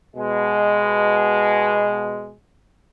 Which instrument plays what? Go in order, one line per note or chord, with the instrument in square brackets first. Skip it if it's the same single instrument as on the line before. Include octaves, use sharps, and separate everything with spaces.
[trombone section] B2 G#3